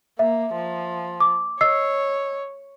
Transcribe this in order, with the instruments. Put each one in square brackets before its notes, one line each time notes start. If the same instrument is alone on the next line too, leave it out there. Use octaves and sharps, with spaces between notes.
[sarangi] A#3 [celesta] E5
[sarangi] F3
[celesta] D6
[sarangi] C#5 [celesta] D#5 E6 C7